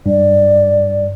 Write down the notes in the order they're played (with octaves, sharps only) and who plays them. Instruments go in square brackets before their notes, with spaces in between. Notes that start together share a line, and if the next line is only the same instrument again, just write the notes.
[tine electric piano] G2 [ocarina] D5